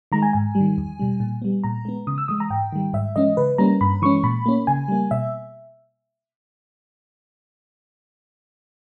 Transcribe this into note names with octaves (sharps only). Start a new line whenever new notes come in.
D#3 G#3 A#5
G#5
G#2 G#5
G3
D#3
E2
B2 G3
A#2
G3 B3
A#2 A#5
G#3 B3
C#3 D#6
E6
E3 G#3 D#6
A#5
G#2 G5
D#3 G3
G#2 E5
E3 G#3 C#4 D#5
C#3 B4
G3 A#3 C#4 A#5
G2 B5
E3 G#3 C#4 C#6
A#2 B5
A#3 C#4
C#3 G#5
G3 A#3
B2 E5